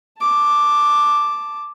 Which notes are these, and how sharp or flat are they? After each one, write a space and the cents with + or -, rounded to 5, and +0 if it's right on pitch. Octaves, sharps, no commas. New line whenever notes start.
A5 +0 D6 +0